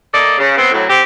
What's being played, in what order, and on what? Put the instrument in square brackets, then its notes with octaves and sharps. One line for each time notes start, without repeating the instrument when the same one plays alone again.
[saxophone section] A#3 A4 D5 D#5
C#3
B3 C4
A2 F#3
C4 G4